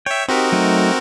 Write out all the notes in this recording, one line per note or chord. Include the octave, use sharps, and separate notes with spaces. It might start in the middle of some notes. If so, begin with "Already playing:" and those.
C#5 E5 G5
C4 D#4 F#4 G4 A#4
F#3 A3 D#4